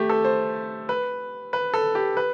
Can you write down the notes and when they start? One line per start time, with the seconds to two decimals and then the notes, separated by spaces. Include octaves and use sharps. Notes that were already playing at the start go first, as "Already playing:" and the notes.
Already playing: A3 G4
0.10 A4
0.25 C5
0.89 B4
1.53 B4
1.74 A4
1.95 G4
2.17 B4